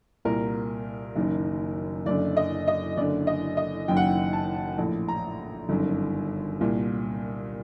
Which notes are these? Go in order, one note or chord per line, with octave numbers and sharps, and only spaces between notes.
C2 A#2 A#4
F#1 F#2 D#3
F#1 F#2 D3 D5
D#5
D#5
F#1 F#2 D3 D5
D#5
D#5
F#1 F#2 D#3 G5
F#5
G5
A5
A#1 A2
A#5
G1 F#2 D#3
C2 A#2